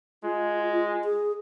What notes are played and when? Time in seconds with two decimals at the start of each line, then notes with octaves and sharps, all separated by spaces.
0.24 G#3 F4
1.05 G#4